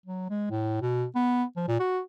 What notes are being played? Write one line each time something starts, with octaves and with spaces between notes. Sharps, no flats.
F#3
G#3
A2
B2
B3
F3
A#2
F#4